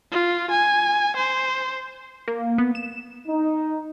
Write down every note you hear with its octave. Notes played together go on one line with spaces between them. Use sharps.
F4
G#5
C5
A#3
B3
E7
D#4